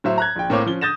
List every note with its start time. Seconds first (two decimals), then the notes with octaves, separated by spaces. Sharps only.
0.04 A2 F#3 C5 E5
0.18 A#5 F#6 G#6
0.36 A#1 G5
0.50 A2 A#3 C4 C#5 D6
0.66 F3 C#4 G7
0.81 D#6 G6 A6 A#6 E7